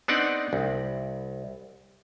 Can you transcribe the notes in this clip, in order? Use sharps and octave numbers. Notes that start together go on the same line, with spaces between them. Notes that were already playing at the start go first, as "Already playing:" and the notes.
B3 C4 D4 D#4 D5 F#5
C2